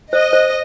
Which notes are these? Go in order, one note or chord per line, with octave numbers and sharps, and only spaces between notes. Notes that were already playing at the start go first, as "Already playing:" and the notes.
C5 D#5
C5